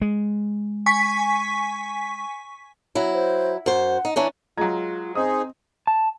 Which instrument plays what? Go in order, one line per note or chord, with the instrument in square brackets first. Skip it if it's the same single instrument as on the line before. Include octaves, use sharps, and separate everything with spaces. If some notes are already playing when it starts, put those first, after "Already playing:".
[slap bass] G#3
[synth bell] G#5 C#6 B6
[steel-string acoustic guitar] F#3 E4
[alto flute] C5
[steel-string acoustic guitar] F#2 C5 [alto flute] F#5
[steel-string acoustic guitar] D#4
[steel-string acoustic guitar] E3 C#4 D4 [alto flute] A#5
[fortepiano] F#3 G#3 [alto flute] F4 [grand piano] A#5 G#6
[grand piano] C4 D#5 D#6 [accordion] D#4 G#4 [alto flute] C5
[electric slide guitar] A5